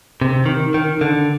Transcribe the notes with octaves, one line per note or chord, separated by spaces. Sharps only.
C3
D#3
D#3
D3